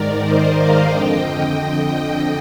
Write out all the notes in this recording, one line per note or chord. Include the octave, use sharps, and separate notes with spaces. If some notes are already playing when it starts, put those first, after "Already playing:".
Already playing: G#2 D#3 A#4 D5
C5 D#5
D5 F5
F2 D3 D#5 G5